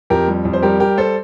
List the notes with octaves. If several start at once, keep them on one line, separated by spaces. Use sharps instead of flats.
F2 G4 A#4
G3
F2
C5
G3 G4 A#4
G3 G4 A#4
G3 A4 C5